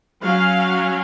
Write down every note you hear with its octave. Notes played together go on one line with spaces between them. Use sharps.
F#3 C#4 F5